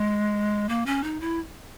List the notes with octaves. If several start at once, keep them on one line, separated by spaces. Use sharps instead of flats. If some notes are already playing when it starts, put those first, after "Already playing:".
Already playing: G#3
A#3
C#4
D#4
E4